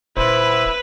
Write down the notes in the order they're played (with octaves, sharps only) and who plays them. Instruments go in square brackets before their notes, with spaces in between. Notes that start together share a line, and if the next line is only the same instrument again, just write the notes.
[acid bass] D#1 [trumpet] E4 [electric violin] B4 [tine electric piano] C5